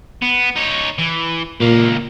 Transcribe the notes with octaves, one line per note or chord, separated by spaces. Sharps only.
B3
D#4 C#5
E3
C#2 A#2 A#3